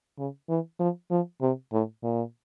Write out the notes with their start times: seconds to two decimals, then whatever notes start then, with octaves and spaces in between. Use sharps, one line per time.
0.18 C#3
0.49 E3
0.80 F3
1.11 F3
1.42 C3
1.73 A2
2.03 A#2